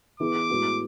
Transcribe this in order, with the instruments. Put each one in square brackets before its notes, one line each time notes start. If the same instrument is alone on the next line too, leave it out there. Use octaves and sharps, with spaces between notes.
[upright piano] E3 B3 E4 G#4 B4 [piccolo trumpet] D6
[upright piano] A2 G#3 B3 F#4